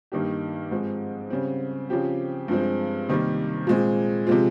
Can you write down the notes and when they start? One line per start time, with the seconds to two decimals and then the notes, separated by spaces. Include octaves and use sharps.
0.12 G2 D#3 A#3 D#4 G4
0.71 G#2 F3 G#3 C4
1.30 C#3 G3 C4
1.90 C#3 F3 C4 G4
2.48 G2 F3 G#3 C4
3.09 C3 D#3 G3 A#3
3.67 A#2 G#3 C4
4.27 C3 F3 G#3 C4 F4